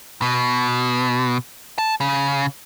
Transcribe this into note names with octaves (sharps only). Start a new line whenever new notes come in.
B2
A5
C#3